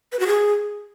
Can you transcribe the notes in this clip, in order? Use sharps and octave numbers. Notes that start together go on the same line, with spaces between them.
B4
F#4
G#4